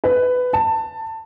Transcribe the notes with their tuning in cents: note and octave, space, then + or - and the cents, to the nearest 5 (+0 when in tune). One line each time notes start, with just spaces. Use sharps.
B4 +15
A5 +20